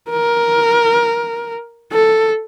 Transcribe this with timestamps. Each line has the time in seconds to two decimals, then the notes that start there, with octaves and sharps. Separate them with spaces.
0.10 A#4
1.92 A4